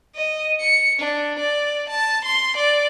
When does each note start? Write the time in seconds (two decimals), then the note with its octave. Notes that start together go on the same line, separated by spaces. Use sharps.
0.16 D#5
0.61 C#7
1.00 D4
1.39 D5
1.89 A5
2.24 C6
2.56 D5